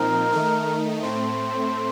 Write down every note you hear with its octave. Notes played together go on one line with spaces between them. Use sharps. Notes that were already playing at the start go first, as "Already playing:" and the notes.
Already playing: A#2 F3 C4 D#4 A#4
D#3 A3 D#4
A2 A3 C4 C5